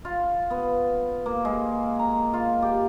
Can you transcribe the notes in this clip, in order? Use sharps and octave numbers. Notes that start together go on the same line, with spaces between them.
F4
B3
A#3
G#3
A#5
F4
G4